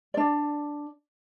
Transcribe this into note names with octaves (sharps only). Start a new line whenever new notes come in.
D4 D5